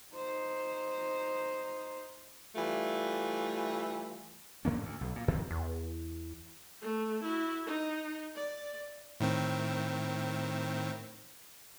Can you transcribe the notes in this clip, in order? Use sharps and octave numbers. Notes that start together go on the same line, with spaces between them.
D#4 C5
E3 G3 A3 F4
G#2 D3 A#3 C#4
D2
B1
A#2
F#2 D#3 F#3 C4
E2
A3
E4 F#4
D#4
D5
A2 D#3 C4